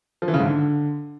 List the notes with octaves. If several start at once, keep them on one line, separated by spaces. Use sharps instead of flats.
F3
E3
C#3
G#2
D3